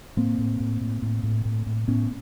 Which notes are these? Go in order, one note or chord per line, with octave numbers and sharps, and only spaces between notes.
A2 A#3 C4
A2
A2
A2
A2
A2
A2
A2
A2 B3 C#4